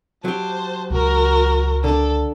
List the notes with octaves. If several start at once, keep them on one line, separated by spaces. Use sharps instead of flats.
F#3 G4 C5 A5
C#2 F#4 A#4
D3 D4 A4